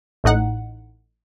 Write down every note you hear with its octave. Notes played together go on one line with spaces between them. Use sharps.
A1 A2 D#4 F#5